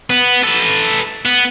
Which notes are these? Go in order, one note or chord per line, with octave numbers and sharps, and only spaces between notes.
B3
A4 B4
B3